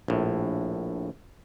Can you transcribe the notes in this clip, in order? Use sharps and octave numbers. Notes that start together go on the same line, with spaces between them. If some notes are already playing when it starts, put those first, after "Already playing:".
A#1 A2